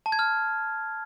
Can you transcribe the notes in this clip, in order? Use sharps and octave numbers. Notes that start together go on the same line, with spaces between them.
A5
G#6
F6